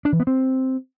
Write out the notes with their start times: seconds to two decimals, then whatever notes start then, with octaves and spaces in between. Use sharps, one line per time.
0.05 D4
0.12 E3
0.20 B3
0.27 C4